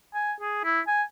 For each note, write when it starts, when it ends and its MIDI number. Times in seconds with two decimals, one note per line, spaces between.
0.14 0.33 80
0.41 0.61 68
0.64 0.80 64
0.88 1.03 80